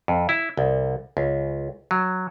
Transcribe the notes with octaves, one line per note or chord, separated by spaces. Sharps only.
F2
E4
C2
C#2
F#3